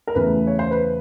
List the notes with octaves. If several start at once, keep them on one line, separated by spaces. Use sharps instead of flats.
A#4
E2 C#3 E3 A3 B4
C#5
C5
B4